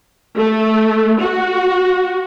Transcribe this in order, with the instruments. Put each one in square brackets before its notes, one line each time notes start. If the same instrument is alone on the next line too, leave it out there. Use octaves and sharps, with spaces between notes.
[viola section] A3
F#4